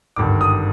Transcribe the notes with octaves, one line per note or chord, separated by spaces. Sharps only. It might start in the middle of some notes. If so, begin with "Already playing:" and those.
G#1 G2 D3 D6
D#6